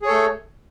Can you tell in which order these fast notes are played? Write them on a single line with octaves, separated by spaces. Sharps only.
G#4 C#5 A4 A3